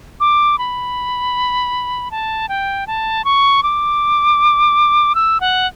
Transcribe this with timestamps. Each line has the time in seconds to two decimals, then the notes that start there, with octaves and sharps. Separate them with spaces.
0.20 D6
0.59 B5
2.11 A5
2.49 G5
2.87 A5
3.25 C#6
3.63 D6
5.15 E6
5.40 F#5